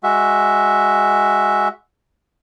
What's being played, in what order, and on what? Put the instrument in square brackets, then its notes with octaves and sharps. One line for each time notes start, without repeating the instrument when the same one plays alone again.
[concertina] G#3 F#4 E5